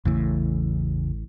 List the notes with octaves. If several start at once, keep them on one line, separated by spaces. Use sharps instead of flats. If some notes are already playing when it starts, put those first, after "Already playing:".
A1 E2 A2 C#3 E3